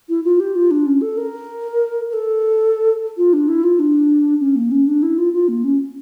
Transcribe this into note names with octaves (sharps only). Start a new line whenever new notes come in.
E4
F4
G4
F4
D4
C#4
A4
A#4
A#4
A4
F4
D4
E4
F4
D4
C#4
A#3
C#4
D4
E4
F4
F4
A#3
C#4